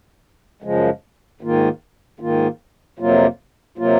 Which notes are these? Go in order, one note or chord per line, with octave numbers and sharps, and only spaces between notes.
F#2 C#3 F3 G#3
G#2 D#3 A#3 F4
G#2 D#3 A#3 F4
F2 C3 F#3 A#3 F4
C3 F#3 A#3 F4